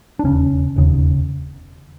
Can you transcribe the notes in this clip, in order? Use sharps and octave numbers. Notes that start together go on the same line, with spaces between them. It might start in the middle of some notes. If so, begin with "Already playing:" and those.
D4
E1 D#2 C#3 C#4
E1 D#2 C#3